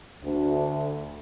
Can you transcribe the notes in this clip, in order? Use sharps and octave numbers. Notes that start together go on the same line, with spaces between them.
D2